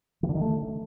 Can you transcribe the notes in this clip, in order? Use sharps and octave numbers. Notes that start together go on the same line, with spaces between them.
E3
D3
D#3
A3